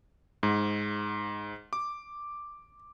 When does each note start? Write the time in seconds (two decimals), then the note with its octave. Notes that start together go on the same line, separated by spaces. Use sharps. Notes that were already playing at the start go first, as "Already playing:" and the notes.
0.43 G#2
1.73 D6